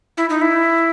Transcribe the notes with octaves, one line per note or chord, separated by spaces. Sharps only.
E4
D#4
E4